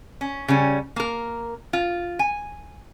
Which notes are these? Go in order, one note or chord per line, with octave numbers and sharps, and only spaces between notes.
C#4
C#3 G3 C#4
A#3 A#4
F4
G#5